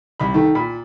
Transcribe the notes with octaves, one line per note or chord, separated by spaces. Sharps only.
C2 B5
D#3 A3
A#2 B5